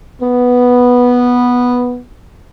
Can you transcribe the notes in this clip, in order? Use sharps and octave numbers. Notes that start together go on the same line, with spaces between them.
B3